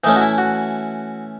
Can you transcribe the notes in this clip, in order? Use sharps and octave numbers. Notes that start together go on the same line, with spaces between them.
E3 A3 C#4 D#4
F#4
E4
F#4